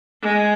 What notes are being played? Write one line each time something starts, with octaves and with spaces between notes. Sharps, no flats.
G#3